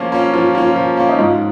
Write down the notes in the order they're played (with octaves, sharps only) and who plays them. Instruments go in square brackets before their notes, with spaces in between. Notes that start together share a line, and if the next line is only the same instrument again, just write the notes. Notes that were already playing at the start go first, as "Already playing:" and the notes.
Already playing: [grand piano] F3 A#3 C#4 [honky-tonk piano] F4
[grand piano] A#3 C#4
[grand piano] F3 [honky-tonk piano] F4
[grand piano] A#3 C#4 [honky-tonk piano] F4
[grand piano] F3
A#3 C#4
[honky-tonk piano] D#4
[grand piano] G#2 [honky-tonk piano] F4